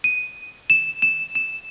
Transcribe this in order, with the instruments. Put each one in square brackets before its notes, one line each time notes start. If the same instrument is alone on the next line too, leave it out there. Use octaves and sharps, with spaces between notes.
[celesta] D#7
E7
E7
E7